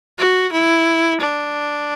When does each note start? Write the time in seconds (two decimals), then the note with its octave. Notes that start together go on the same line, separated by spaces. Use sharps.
0.18 F#4
0.52 E4
1.21 D4